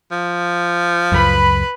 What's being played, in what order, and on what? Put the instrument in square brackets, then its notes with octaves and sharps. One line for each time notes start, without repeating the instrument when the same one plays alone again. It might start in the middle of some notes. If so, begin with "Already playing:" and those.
[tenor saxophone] F3
[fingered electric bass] C#2 F#2 [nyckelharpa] B4 B5